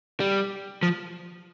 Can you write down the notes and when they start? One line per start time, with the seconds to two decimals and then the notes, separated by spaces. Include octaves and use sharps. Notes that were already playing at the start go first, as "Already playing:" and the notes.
0.20 G3
0.83 F3